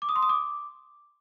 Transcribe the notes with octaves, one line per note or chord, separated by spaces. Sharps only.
D6
D#6
C6
D#6
D6